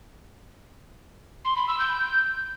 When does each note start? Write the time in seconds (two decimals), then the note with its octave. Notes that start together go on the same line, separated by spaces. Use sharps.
1.45 C6
1.56 B5
1.68 E6
1.79 G6